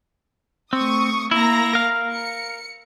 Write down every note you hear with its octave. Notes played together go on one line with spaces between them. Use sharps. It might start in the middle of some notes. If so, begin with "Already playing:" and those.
A3 C4 C#6 D#6
A#3 E4 A#5 A#6
A#4 F5
C#7